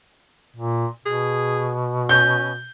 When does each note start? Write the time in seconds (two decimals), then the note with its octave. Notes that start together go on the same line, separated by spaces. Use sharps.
0.56 A#2
1.06 B2 G#4
2.09 C#4 G6